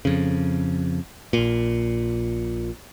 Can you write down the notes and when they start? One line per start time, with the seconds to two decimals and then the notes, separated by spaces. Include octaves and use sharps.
0.05 F2 C#3
1.33 A#1 A#2